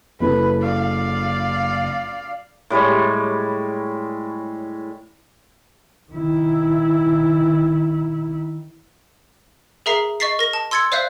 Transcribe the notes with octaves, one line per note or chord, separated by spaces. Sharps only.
F#1 E4 A4 B4
D5 F5
A2 G3 G#3 C#5
D#3 E4
G#4 A#4 E5 A#5 C7
D#5 C#6 A6 B6 C7
A#4 A#6
A5
C6 E6 G#6 A6 C#7
C5 D5 E5 F5 F#6 G6